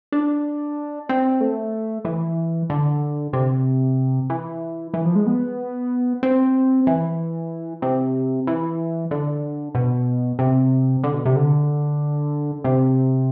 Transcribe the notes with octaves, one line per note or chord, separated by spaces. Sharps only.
D4
C4
A3
E3
D3
C3
E3
E3
F3
G#3
B3
C4
E3
C3
E3
D3
B2
C3
D3
B2
C3
D3
C3